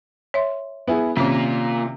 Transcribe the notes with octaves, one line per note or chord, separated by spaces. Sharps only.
C#5 E5 C6
B3 E4 G#4
C3 D#3 A#3 C#4 F4